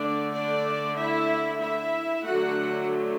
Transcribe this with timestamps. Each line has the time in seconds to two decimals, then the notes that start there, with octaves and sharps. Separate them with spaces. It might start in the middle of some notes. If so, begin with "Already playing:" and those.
Already playing: D3 A3 D4 D5
0.33 D4 D5
0.97 E4 E5
1.61 E4 E5
2.26 D3 F#3 A3 F#4 F#5